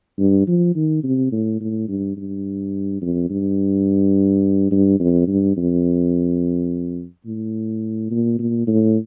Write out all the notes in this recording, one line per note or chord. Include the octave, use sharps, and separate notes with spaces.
G2
F3
D#3
C3
A2
A2
G2
G2
F2
G2
G2
F2
G2
F2
A2
A#2
A#2
A2